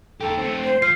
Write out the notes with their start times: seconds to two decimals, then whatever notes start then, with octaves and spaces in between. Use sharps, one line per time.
0.21 D#4 G4 A4
0.38 A3 C4
0.64 C5
0.82 F3 F6 C7